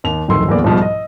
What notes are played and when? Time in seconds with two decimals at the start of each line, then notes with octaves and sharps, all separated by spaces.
0.04 D#2 F7
0.28 D1 F2 D#3 C6 E6
0.48 D1 E2 A#3 B3 B4 D5
0.64 C2 G#2 B2 F3 G3
0.81 D#5